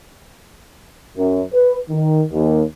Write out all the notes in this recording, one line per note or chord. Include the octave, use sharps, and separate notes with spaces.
F#2
B4
D#3
D#2